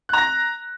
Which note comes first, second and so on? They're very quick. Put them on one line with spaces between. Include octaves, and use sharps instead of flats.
F#6 A#5 A#6